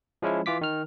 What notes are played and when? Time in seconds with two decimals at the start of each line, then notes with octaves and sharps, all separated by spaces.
0.22 F3 G#3 C#4 E4
0.46 E3 F4 D6 B6
0.61 D#3 F6